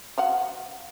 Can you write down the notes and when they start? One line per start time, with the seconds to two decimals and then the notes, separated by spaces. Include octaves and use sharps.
0.18 F#3 F5 F#5